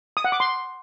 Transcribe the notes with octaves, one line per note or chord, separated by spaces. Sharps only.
D#6
F#5
D6
C6